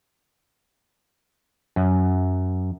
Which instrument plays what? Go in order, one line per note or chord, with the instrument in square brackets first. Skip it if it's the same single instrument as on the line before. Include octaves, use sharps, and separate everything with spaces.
[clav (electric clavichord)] F#2